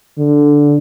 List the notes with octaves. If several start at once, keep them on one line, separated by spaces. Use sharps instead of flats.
D3